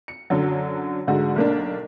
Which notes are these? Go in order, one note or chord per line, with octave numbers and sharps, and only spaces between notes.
C#7
F#2 D3 F#3
G#2 D3 F#4
B1 A#3 D4